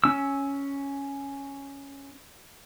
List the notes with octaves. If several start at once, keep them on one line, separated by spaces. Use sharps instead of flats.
C#4 E6